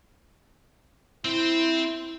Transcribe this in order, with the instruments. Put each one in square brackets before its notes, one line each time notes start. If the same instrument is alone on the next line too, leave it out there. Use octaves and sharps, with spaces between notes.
[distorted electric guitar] C4 C5 [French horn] E4